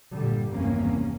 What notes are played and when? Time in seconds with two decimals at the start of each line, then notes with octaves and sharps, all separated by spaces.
0.13 G1 A#2 D3 G3
0.51 G#1 E2 G2 C3 A#3 C#4